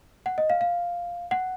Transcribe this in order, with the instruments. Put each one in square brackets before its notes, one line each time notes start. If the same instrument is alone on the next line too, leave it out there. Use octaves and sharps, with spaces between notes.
[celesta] F#5
D#5
F5
F5
F#5